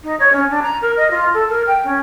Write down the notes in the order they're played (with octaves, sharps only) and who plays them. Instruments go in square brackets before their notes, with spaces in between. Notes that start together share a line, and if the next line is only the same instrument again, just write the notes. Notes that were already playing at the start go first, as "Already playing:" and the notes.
[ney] D#4
C#5
C#4
D4
A#5
A#4
D#5
F4
A4
A#4
G5
C#4